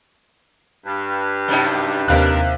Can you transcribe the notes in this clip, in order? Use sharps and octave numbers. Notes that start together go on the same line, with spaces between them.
G2
F#2 C3 D#4
D#2 C3 D4 A#4 F5 F#6